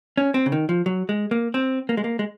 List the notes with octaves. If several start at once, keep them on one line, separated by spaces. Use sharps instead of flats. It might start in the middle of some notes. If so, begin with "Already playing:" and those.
C#4
C4
C#3
D#3
F3
F#3
G#3
A#3
C4
A#3
G#3
A#3
G#3